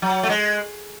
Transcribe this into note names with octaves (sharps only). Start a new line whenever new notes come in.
F#3
A3
G#3